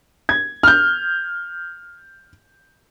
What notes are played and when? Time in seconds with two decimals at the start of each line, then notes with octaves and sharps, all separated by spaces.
0.29 G#6
0.63 F6 G6